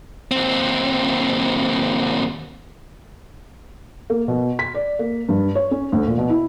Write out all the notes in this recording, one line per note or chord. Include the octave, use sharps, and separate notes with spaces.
D#2 C4
A#3
B2
B6
D5
A#3
G2
C#5
C#4
D2
A#2
B2
E4